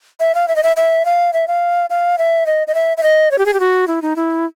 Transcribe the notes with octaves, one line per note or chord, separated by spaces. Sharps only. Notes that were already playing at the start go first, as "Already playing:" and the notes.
E5
F5
E5
D#5
E5
E5
F5
E5
F5
F5
E5
D#5
D#5
E5
E5
D#5
C#5
G4
G#4
G4
F#4
E4
D#4
E4